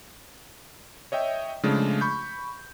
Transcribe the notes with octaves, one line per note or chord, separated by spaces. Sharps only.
C#5 D#5 E5 G5
C#3 F3 G#3 A3 D4
B5 C#6 G6